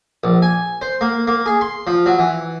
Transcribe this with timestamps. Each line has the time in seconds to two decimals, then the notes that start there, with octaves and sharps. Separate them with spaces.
0.24 A#1
0.42 G#5
0.82 C5
1.01 A#3
1.27 A#3
1.46 G#4
1.61 C6
1.87 F3
2.06 F#3
2.19 E3